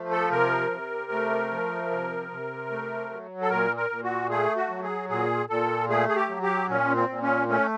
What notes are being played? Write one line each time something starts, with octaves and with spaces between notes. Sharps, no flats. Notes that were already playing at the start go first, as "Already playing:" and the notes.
Already playing: F3 A3
A4
C3 A#4
C3
A3
F3
C3
C3
A3
F#3
A4
A#2 A#4
A#4
A#2
F#4
A3 G#4
F#4
F#3
G#4
A#2 G#4
A#2 A4
A3 G#4
G#4
G4
F#3
G4
A#2 C#4
C4
A#2
C#4
A3 C#4